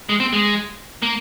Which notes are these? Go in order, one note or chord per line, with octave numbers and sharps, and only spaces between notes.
G#3
C4
G#3
A#3